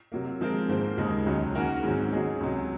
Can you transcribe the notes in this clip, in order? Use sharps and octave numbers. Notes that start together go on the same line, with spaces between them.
C3 F#3 A#3
F3 G#3 C4 F4 A#4
G#2 D#3 A#3 F4 C5
D#2 C#3 G#3 D#4
C#2 C#3 F#3
D#3 A#3 C#4 F#4 A#4
G#2 D#3 F#3 C4
F#3 C#4 G#4 D#5
C#2 C3 F#3